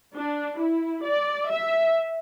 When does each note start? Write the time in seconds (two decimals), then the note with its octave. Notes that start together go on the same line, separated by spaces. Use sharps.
0.15 D4
0.61 E4
1.06 D5
1.52 E5